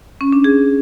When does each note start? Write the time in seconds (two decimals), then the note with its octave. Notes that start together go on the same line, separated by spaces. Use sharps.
0.21 C#4
0.33 D4
0.44 G#4